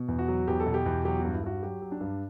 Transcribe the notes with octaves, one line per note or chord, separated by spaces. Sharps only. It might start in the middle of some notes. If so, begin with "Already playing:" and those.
Already playing: B2
E2
F#4
F#3
E2 G4
A4
B2
G4
E2
F#3 G4
G2 F#4
E4
G2 F#4
F#3 G4
F#3
D4
G2